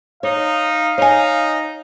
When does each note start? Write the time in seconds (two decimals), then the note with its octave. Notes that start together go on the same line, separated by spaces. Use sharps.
0.23 D#4 C#5 F5
0.98 D#4 C#5 G#5